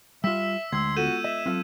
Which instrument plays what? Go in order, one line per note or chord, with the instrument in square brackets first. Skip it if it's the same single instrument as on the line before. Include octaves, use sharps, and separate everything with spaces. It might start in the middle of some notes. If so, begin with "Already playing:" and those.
[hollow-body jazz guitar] G3 F4 [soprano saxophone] E5 [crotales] E6 B6
[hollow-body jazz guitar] D2 [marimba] G#3 [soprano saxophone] C6 [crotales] E6 G#6
[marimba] B3 F4 A4 [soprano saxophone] F#4 [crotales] G6 D#7 E7
[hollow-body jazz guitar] D#5 [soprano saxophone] E5
[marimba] F#3 [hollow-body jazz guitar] C4 F4 A4